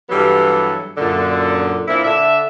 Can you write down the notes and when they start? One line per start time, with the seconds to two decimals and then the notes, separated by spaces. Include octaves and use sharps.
0.10 G2 E3 F#3 G3 B3 A4
0.98 F#2 A#2 D3
1.88 A#2 A#3 C4 D4 E4
2.05 D3 E5